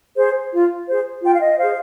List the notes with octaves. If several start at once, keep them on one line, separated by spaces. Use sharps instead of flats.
G#4 C5
F4
G#4 C5
F4 G5
F5
D#5
G#4 C5 F5